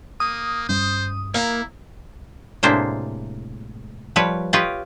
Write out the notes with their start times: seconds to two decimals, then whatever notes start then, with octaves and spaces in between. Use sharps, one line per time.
0.20 A#3 D#6
0.69 G2 G3 C#4 C5
1.34 A#3 E4 A#5
2.63 A2 C3 G#3 A#3 D4 C5
4.16 F3 G3 B4 C#5
4.53 F4 G4 B4 C#5 D#5